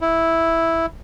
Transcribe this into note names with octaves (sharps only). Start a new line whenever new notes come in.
E4